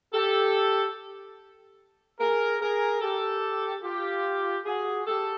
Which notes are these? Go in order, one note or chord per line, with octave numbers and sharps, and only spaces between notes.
G4 A4
G#4 A#4
G#4 A#4
G4 A4
F4 G4
F#4 G#4
G4 A4